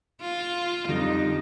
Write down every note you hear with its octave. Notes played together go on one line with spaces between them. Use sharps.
F4
F2 D3 G3 D#4